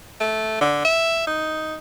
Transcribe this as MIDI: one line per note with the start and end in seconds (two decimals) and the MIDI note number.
0.21 0.57 57
0.61 0.81 50
0.85 1.27 76
1.27 1.77 63